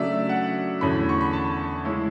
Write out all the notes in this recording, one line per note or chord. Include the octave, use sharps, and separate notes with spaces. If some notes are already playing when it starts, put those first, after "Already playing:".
Already playing: C#3 F#3 A3 D4 D5 E5
F#5
E2 D3 A3 C#4 B5
C#6
B5
A5
C#3 G#3 C#4 E4 C#6